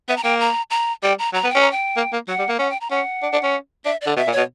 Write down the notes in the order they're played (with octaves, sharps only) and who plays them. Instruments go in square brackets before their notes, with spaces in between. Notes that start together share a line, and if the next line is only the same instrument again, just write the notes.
[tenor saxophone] B3 [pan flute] E5
[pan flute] A#5
[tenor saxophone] A#3 [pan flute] G5
[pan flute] A#5
A#5
[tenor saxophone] G3 [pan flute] G5
[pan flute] A#5
[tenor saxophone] F#3 [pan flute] A#5
[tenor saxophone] B3
[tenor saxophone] C#4 [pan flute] G5
[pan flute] A#5
G5
[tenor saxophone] A#3
A#3
[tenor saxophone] F#3 [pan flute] F#5
[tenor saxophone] G3
A#3
[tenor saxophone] C#4 [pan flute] F#5
[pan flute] G5
A#5
[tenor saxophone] C#4 [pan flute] F#5
[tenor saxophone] D4
D4
C#4
[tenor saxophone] D4 [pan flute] E5
[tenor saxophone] D3 [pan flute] D5
[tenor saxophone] B2 [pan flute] E5
[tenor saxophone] A#2
[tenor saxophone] B2 [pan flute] C#5